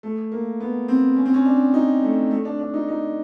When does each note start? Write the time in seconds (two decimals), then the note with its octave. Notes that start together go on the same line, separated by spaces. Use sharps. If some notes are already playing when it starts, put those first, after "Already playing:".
0.03 A3
0.32 A#3
0.60 B3
0.88 C4
1.16 C#4
1.26 C4
1.34 C#4
1.46 D4
1.74 D#4
2.03 A3
2.31 A3
2.45 D4
2.59 D4
2.74 D#4
2.89 D#4